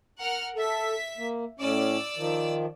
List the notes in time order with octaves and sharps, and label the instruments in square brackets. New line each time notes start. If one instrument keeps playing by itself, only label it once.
[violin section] A#4 F#5 F6
[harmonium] A4 [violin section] E5 B6
[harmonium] A#3
[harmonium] A2 C#4 [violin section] D5 E6
[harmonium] D#3 F3